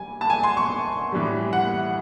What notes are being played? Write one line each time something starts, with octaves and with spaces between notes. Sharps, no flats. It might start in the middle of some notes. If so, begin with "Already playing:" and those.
Already playing: G3 G#5
A5
G#5
C6
C#6
A2 E3 G3
F#5